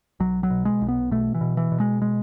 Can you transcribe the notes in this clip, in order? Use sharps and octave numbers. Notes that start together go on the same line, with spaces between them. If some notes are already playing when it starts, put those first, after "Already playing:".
B1 F#3
F#3
B2
G#3
B1
B3
B2 A3
E3
B2
E3
B2
G#3
G#3